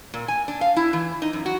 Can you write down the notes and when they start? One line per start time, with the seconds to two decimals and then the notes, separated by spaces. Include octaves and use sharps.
0.14 A#2
0.28 G#5
0.48 D4
0.61 F5
0.76 E4
0.93 E3
1.22 D#4
1.33 F#2
1.46 F#4